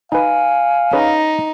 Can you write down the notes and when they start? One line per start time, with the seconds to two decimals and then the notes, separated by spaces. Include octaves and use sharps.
0.12 D#4 B4 F5 G#5
0.93 C#4 D#4 G#4 B4